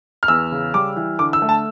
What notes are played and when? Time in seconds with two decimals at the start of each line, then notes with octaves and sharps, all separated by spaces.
0.23 F6
0.28 E2 E6
0.52 C#3
0.74 G3 D6
0.96 E3
1.19 D3 D6
1.33 E6
1.42 A3
1.49 A5